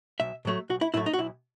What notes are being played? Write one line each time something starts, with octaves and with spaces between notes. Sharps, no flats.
B1 E5
A2 F#3 A3
B1 F#4
E4
A2 F#3 A3 E4
D#4
F#4
B1 E4